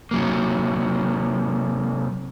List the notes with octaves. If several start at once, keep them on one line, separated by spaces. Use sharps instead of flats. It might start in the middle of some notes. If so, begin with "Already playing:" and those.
C3 F#3 A#3